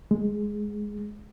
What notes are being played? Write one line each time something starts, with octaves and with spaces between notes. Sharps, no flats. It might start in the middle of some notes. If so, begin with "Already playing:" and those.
G#3